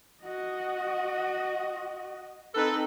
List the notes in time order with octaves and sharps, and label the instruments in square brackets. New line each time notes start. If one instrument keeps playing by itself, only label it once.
[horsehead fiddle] F#4 D#5
[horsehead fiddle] C4 D#4 [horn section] A4 B4